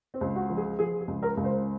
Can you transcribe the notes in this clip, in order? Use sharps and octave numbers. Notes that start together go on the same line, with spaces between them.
C4
C#2
F#4
F3
G#4
F3 G#4
G#4
C#2
A#4
C#2
C5